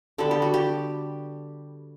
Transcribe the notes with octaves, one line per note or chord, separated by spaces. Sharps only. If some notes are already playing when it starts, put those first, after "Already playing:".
D3 G3 B3 A4
G4
F#4
G4